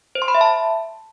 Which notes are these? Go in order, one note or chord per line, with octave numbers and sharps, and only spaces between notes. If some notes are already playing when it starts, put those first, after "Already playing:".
C5
C6
B5
E5
A5